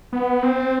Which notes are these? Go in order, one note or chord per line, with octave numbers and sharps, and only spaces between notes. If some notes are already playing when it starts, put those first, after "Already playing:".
B3
C4